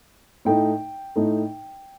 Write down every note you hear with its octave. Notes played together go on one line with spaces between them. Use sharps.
A2 A3 D#4 G5
A2 A3 D#4